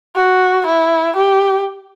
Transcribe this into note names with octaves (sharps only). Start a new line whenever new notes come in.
F#4
E4
G4